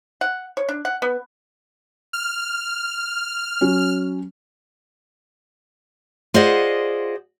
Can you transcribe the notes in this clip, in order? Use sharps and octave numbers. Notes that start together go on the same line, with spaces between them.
F#5
C#5
D4
F#5
B3
F6
F#3 C#4
F4 G#4 C5 D5 D#5 F#5